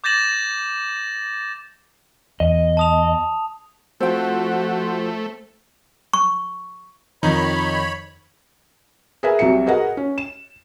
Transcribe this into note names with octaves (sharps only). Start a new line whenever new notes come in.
D6 G6 A6 A#6 E7 F#7
E2 D#5
A5 D#6 F7
F3 A3 C4 F#4 C5 G5
C#6
F2 D#3 D#4 C#5 B5
G#4 A#4 B4 E5 G#5
C2 C3 F#3 F#4 E5 C#7
F#4 G#4 A#4 B4 D#5 F#5
C#4
E7